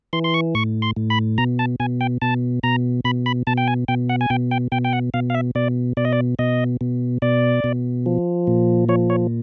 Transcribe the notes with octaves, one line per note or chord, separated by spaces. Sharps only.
E3 C6
C6
C#6
A2 C#6
C6
A2
B5
B2 A#5
A5
B2 G#5
G5
B2 A5
B2 A#5
B2 B5
B5
B2 A5
G5
G#5
B2 G5
F#5
G#5
B2 G5
G5
B2 G5
G5
F#5
B2 F5
F5
E5
B2 D5
B2 D5
D#5
D5
B2 D#5
B2
B2 D5
B2
F3
A#2
F3 C#5
C#5